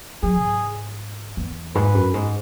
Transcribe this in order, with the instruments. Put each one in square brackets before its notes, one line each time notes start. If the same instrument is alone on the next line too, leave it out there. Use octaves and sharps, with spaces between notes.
[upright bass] F#3 [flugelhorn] G#4
[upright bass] G#2
E2
[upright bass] G#2 [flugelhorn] B4
[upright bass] F#2
G#2